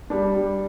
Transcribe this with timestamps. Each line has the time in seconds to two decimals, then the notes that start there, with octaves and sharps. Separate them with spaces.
0.10 G3 D4
0.34 G3